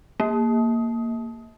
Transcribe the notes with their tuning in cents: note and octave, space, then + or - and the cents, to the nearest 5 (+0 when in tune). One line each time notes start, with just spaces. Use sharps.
A#3 -10